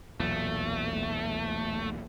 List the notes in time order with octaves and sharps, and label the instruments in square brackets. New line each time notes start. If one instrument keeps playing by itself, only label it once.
[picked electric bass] B1 E2 A#2 [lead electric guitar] A3